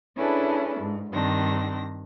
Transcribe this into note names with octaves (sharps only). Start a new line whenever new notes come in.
C#4 D4 E4 G#4 A4 B4
G#2
G2 D#3 C4 D4 A#6